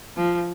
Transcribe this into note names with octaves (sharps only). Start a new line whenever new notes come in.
F3